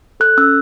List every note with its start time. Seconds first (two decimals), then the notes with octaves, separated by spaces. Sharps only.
0.20 A4 F#6
0.37 C#4 E6